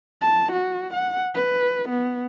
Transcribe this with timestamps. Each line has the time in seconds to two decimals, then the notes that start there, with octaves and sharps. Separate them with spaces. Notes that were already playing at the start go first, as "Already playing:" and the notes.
0.21 A5
0.52 F#4
0.93 F#5
1.35 B4
1.89 B3